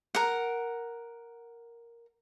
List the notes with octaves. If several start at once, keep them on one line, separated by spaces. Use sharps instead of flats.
A#4 F#5